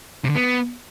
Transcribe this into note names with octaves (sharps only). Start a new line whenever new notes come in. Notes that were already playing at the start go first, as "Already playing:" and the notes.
C3
D3
B3